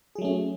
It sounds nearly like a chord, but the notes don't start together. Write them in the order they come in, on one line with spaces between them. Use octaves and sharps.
G#4 F#3 A3 C#4